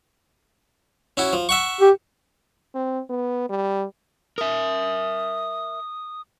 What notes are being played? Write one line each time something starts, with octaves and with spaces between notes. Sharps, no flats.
C#4 E4 F#4
F3
E5 F#5 C#6
G4
C4
B3
G3
A#4 E5 D#6